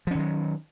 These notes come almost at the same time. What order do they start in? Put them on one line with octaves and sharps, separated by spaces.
F3 C#4 D#3 F#3